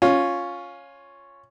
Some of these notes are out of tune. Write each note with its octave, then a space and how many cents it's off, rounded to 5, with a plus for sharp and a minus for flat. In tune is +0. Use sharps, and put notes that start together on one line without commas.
C#4 +0 F4 +10